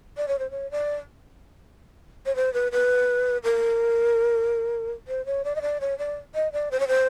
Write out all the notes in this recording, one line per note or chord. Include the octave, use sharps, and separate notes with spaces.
D5
C#5
C5
C#5
D5
C#5
C5
B4
B4
A#4
C5
C#5
D5
D#5
D5
C#5
D5
D#5
D5
C5
C#5
C5